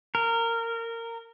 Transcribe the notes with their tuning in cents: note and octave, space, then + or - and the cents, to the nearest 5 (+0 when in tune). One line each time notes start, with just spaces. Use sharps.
A#4 -20